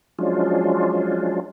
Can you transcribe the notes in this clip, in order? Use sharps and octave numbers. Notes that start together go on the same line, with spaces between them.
F3 F#3 G#3 C#4 D4 F4